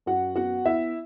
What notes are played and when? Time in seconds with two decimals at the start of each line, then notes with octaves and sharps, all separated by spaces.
0.06 F#2 F#4 F#5
0.35 B3 F#4 F#5
0.65 B3 E4 E5